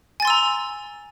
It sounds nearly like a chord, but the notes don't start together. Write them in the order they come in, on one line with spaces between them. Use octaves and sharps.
G#5 A6 C6 E6 A#5